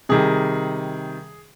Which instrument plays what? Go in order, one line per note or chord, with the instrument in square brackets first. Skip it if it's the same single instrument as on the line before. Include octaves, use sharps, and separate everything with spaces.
[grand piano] C3 D#3 G3 G#4